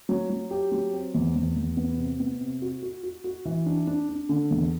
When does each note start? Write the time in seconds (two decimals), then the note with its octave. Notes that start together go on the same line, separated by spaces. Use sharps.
0.09 F#3
0.30 F#3
0.51 G4
0.72 F#3
0.93 C4
1.14 E2
1.35 E2
1.56 E2
1.77 B3
1.98 C3
2.20 B3
2.41 C3
2.62 F#4
2.82 F#4
3.03 F#4
3.24 F#4
3.45 E3
3.66 D4
3.87 D4
4.09 D4
4.29 D3
4.51 E2